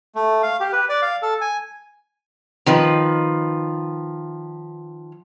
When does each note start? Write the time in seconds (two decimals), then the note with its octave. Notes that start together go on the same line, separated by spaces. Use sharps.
0.15 A3
0.43 F5
0.60 G4
0.73 B4
0.89 D5
1.02 F5
1.22 A4
1.41 G#5
2.66 D#3 F3 B4